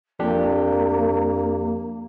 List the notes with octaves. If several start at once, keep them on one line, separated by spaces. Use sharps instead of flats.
F2 A#3 D4 G4